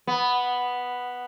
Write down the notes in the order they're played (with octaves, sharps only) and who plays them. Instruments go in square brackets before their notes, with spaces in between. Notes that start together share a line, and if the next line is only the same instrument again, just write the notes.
[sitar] B3